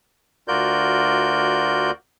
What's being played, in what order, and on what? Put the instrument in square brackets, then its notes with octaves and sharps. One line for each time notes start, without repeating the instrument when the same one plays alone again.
[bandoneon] D2 F4 F#4 A#4 D5 G6